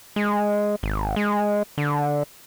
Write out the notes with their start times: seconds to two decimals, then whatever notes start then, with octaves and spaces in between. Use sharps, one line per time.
0.16 G#3
0.83 G#1
1.16 G#3
1.78 D3